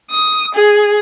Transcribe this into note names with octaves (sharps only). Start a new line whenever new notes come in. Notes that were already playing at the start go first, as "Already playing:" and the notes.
D#6
G#4